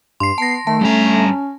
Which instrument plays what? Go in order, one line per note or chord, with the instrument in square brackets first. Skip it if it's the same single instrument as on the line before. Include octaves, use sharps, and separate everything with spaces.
[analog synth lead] G2 [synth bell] C6 C7
[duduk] B3 [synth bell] A5 A#6 [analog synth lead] C7
[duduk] D#3 [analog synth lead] A3 [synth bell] A5
[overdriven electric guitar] G2 A#5 [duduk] C#4